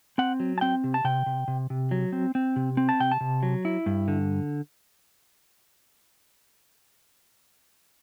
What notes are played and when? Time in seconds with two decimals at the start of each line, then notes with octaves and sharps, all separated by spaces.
0.18 C4 F#5
0.40 F#3
0.58 A5
0.61 C4 G5
0.84 C3
0.94 A5
1.04 C3 G5
1.26 C3
1.48 C3
1.70 C3
1.91 F#3
2.12 C4
2.35 C4
2.56 C3
2.77 C4
2.89 A5
3.00 C3 G5
3.12 A5
3.21 C3
3.43 F#3
3.65 E4
3.86 G2
4.08 D3